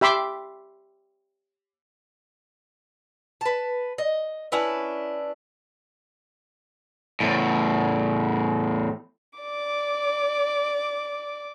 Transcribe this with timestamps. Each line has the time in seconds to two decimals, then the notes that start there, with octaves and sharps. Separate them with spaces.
0.01 G4 E5 B5 C6 D6
3.41 B4 A5
3.98 D#5
4.52 C#4 D4 E4 B4
7.20 E2 A2
9.41 D5 D6